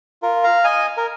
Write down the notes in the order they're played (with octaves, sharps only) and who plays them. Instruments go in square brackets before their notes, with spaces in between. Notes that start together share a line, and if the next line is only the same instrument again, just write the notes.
[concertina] F4 A#4
F5 A#5
D#5 G#5
A#4